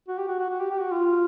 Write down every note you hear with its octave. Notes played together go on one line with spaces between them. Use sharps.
F#4
G4
F#4
F#4
F#4
G4
G4
F#4
F4